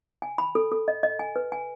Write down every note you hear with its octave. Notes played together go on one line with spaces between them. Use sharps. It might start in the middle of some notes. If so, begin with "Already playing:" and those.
G#5
B5
A4
A4
D#5
D#5
G#5
B4
G#5